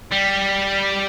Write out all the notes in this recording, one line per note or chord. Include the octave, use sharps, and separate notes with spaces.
G3